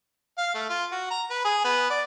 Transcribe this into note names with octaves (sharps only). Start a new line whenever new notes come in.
F5
A3
F4
F#4
A#5
B4
G#4
B3
D5